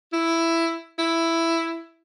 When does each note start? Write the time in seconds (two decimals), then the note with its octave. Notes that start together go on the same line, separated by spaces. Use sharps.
0.13 E4
0.99 E4